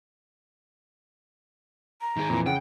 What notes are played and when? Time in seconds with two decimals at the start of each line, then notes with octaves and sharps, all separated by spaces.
2.01 A#5
2.17 D#3 G#4
2.30 F2 A#2 E3
2.46 C#3 F#5 G5